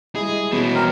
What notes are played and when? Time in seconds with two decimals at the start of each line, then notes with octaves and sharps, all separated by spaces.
0.15 G3 G#3 E4 G#4 D#5
0.52 B2 E3 B3 C#4
0.75 A#3 C4 A#4